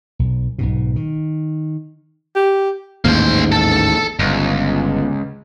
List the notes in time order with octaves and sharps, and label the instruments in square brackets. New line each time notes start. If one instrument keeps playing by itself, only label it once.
[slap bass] B1
B1 G#2 B2
D#3
[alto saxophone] G4
[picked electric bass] A1 D#2 G#2 [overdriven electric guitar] A#3 C5
[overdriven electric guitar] A4 A5
[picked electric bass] G1 [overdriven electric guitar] C#2